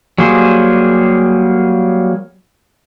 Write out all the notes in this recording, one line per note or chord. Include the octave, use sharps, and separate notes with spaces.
F#3 G3 A#3 G#4 C5